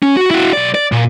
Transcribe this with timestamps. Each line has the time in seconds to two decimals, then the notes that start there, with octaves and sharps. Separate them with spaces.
0.03 C#4
0.17 F#4
0.31 E4 F#4
0.53 B1 D5
0.75 D5
0.92 A#2